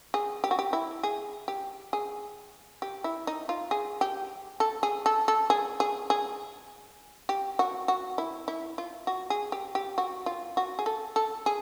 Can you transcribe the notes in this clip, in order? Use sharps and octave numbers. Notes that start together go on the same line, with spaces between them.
G#4
G4
F#4
G4
E4
G#4
G4
G#4
G4
E4
D#4
F4
G#4
G4
A4
G#4
A4
A4
G#4
G#4
G#4
G4
F#4
F#4
E4
E4
F4
F#4
G#4
G4
G4
F#4
F4
F#4
G#4
A4
A4
G#4